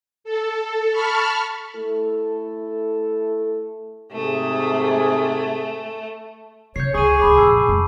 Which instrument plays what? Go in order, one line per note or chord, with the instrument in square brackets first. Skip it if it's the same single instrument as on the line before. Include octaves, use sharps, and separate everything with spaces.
[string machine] A4
A5 B5 C#6 F6
[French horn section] A3 E4 A4
[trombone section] G#2 C3 G#4 [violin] A3
[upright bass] C#3 [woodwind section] C#5 [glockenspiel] G6 C7
[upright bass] C#2 [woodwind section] G#4 [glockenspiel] C#6 D#7
[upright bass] F#1 D#2 [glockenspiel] B5 D6
[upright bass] F2 A#2 [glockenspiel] A5 E6 C7
[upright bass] F2 G#3